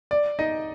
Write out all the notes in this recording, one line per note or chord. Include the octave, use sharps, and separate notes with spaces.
D5
D#4 D#5